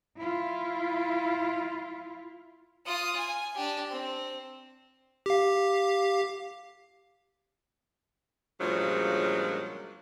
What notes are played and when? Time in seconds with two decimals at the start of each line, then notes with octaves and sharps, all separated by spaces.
0.17 E4 F4
2.86 F4 D#6
3.16 G#5
3.55 D4 G4
3.91 C4
5.26 G4 F5
8.61 G2 A#2 C#3 F3 F#3 G#3